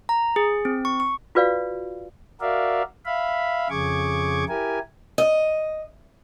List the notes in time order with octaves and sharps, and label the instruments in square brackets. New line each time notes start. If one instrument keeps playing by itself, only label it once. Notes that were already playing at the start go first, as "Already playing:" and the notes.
[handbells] A#5
G#4
C4
C#6
C#6
[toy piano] F4 F#4 B4 D5 F5
[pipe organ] F#4 A#4 D5 E5 F5
E5 F5 B5
F2 C#3 G#4 C#6 D6 G#6
E4 G4 A#4 G#5
[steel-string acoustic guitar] D#5